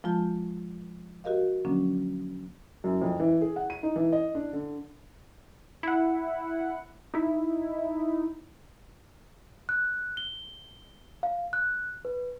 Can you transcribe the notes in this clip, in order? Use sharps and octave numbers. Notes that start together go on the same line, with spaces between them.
F3 G#3 F4 A5 G6
F#4 G4 A#4 D#5 F5
D3 F3 F#3 A#3 C#4 D4
F#2
F2
E3
G#4
F#5
D#7
D#4
E3
D#5
D4
D3
E4 F#5
D#4 E4
F#6
G7
F5
F#6
B4